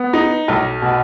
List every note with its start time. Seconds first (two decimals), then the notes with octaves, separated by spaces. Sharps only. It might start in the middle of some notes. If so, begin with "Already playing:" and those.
Already playing: B3
0.13 D#4
0.48 B1
0.82 B2